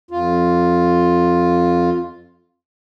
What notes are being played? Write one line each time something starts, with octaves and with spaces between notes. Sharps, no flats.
F2 F4